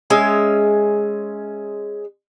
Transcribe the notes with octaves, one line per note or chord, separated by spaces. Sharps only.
G#3 C#4 E5